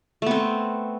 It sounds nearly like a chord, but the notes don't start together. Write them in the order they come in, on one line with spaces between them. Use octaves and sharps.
A3 B3 C4